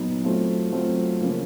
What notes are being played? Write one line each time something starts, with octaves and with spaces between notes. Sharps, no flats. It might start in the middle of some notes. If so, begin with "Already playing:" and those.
Already playing: A#2 F#3 B3 D#4
F#3 A3 C4 F4
F#3 A3 C4 F4
C#3 F3 A#3 C#4